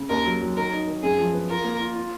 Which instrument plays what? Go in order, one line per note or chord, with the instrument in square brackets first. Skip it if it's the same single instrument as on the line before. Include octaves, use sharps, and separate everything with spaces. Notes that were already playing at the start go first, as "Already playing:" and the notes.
Already playing: [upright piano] C#3
[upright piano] D#2 [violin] A#4
[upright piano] F#3
F#3
[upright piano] D#3 [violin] A#4
[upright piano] D#4
D#3
[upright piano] F#2 [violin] G#4
[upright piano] F3
B3
[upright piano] F4 [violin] A#4
[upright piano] A#3
F4
F4